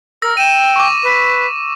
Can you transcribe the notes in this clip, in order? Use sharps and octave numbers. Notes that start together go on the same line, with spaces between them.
A#4 E6 A#6
G5 D#7 E7
C#6 D6
B4